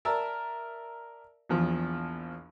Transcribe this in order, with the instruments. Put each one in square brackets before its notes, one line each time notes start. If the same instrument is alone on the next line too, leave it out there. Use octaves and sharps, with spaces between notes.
[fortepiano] A#4 D5 E5 A5 E6
A#1 E2 F3